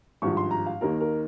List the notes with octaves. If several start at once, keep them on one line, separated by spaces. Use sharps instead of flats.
G#1 G2 F3 C#6
C6
A#5
F5
D#2 D#3 A#3 A#4
A#4